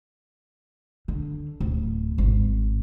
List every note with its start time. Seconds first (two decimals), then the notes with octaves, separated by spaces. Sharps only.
1.08 D3
1.60 D1
2.18 G#1